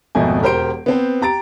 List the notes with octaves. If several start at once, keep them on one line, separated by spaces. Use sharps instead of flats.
G#1 F2 B2 A3 D#5 G#5
E1 G4 A#4 C5 C6 D7
B3 C4 C5
G4 A#5 A6 D7